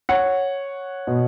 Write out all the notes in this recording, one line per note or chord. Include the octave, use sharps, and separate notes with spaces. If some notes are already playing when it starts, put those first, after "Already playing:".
C#5 F#5
B2